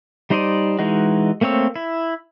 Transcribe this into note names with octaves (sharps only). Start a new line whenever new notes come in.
G3 D#4 C5 D5 D#5
E3 G#3 D#4 F#4
A3 A#3 C4 C#5 E6
E4